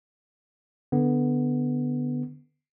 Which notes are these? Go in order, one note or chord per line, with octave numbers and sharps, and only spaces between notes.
D3 B3